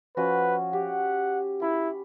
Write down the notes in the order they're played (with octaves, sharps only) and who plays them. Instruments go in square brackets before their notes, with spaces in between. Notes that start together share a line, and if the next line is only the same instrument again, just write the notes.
[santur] F3 C#4 F#4 [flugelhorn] B4
[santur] G4 [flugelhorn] F#5
[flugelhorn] E4 [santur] B5